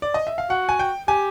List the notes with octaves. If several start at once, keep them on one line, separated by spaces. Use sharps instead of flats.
D5
D#5
E5
F5
F#4 F#5
G#5
G5
G4 G#5